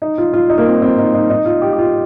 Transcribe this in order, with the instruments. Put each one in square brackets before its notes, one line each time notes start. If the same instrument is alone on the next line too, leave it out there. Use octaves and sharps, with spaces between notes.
[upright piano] D#4
F4
F4
D#4
A#3
C4
C4
D#4
D#4
D#4
F4
G4
G4
F4